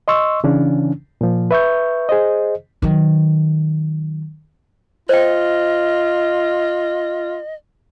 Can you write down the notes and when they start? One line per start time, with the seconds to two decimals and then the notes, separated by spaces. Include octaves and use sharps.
0.08 D#5 C6 C#6 E6
0.44 C#3 E3 C#4 D4
1.21 A#2 F3
1.51 B4 E5 C#6 G6
2.09 G#4 C5 D#5
2.82 D#3 F#3
5.09 F4 C5 D#5 G5